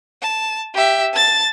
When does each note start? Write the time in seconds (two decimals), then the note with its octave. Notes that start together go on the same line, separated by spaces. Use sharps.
0.22 A5
0.74 G4 E5
1.13 A5 A6